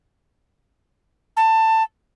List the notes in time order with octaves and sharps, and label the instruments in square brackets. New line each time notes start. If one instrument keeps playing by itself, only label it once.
[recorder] A5